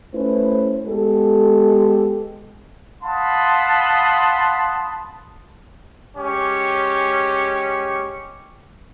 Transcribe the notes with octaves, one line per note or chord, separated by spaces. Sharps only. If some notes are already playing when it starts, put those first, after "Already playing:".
A3 C#4 E4 B4 C5
G#3 B3 G4 A4
F5 F#5 A5 B5 C6 D#6
G#3 C#4 G4 C#6